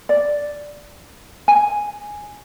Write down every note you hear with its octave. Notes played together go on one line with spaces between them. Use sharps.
D5
G#5